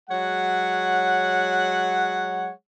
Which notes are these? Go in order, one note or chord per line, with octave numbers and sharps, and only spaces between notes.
F#3 G#3 C#5 F#5